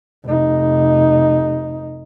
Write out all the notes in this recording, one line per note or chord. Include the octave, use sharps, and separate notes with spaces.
F1 D#4